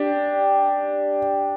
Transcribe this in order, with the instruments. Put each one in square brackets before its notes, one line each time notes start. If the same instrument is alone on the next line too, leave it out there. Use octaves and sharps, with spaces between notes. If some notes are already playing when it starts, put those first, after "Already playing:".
Already playing: [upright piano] D4 G4